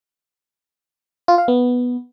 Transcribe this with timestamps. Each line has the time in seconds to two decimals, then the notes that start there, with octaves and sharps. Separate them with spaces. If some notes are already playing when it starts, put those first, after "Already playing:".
1.28 F4
1.38 F5
1.48 B3